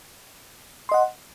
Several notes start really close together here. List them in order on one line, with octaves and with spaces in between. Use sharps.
C6 D#5 F#5